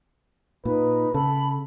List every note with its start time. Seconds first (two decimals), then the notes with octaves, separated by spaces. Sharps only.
0.65 A#2 D#4 B4
1.14 C#3 A4 B5